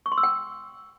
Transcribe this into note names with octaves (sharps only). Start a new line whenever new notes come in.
C#6
C6
E6
G5